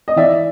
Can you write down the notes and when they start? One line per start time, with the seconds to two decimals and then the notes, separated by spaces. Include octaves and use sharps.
0.08 D#5
0.16 E3 D5 E5